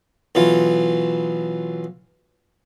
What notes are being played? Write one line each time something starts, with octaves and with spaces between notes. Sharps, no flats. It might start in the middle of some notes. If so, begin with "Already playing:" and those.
B1 E3 F4